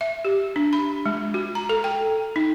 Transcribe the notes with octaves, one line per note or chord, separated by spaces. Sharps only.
E5
G4
D4
B5
G#3
F#4
A#5
A4
G5
D#4